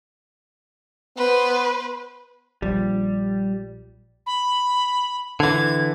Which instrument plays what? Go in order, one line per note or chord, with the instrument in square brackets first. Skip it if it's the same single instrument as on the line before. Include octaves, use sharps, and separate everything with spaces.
[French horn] B3 [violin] B4 C5
[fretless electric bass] A#1 F3 [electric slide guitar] G3
[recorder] B5
[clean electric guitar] D3 E3 [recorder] G#6